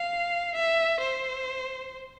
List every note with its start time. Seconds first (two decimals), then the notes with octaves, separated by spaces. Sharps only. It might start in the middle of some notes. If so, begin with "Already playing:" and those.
Already playing: F5
0.55 E5
1.00 C5